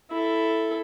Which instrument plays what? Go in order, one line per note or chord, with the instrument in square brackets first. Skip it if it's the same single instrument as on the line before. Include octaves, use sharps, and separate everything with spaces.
[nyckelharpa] E4 A4